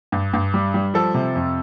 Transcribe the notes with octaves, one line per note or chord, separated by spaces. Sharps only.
G2
G2
G3
G3
F3 A4
C3
F2